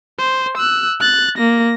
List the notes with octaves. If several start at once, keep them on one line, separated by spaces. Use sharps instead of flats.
C5
E6 F#6
F#6 A6
A#3 A#6